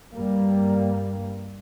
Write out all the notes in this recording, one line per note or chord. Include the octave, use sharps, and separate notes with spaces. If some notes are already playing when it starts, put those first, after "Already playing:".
G2 G3 A#3